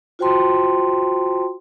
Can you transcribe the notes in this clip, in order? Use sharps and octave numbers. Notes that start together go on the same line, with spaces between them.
F4 F#4 C5 G5 A5 C6